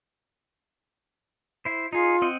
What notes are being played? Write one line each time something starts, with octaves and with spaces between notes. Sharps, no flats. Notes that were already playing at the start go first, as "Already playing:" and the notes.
E4 C5
D#4 F4 G#4
C4 D#5 F#5